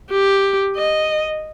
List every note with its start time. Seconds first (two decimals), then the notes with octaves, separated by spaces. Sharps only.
0.11 G4
0.76 D#5